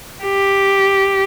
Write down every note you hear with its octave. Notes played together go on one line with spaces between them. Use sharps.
G4